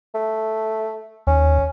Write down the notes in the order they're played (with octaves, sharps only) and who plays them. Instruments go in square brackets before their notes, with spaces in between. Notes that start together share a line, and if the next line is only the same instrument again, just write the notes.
[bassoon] A3
[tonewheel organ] D#2 [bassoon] C#4